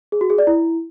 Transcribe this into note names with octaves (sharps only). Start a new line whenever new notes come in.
G#4
F#4
G#4
D5
E4